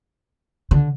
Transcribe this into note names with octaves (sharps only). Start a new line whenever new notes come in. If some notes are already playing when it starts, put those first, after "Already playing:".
D3